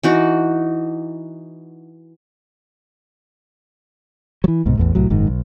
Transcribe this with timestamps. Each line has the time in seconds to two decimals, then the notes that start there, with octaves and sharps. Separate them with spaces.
0.03 E3 D#4 F#4
4.44 E3 F#3
4.66 C2 G#2 B2
4.78 A1 E2 A2
4.95 C2 A2 F#3
5.10 F#1 G#2 D#3
5.27 B1